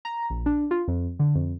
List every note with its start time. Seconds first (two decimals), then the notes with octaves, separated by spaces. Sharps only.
0.05 A#5
0.30 A#1
0.46 D4
0.71 F4
0.88 F2
1.19 D3
1.35 F2